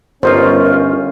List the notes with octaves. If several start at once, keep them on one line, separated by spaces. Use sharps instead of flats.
G1 C#4 D#4 F4 A#4 C5